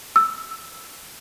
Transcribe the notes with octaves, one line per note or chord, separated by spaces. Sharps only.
E6